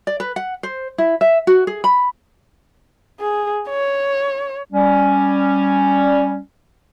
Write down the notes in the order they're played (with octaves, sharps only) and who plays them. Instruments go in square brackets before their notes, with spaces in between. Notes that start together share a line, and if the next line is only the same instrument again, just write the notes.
[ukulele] D5
B4
F#5
C5
E4
E5
F#4
G#4
B5
[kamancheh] G#4
C#5
[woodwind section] G3 C#4